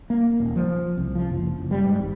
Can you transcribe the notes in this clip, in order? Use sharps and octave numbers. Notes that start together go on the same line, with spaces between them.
A#3
D#1
F3
C2
F3
F#1
F#1
G3
G#2
G#1